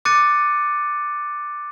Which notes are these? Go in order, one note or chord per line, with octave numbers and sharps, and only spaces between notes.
D6 F#6 A6 C#7 D#7